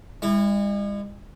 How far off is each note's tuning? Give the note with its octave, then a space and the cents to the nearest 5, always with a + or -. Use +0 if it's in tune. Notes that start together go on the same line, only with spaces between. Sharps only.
G#3 -45 E4 +0